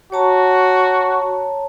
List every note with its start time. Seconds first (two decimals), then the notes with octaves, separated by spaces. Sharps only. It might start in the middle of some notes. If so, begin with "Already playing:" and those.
0.12 F#4 C#5 A5 A#5